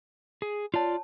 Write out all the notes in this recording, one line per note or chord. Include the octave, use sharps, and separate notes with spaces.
G#4
F4 C#5 D5 A5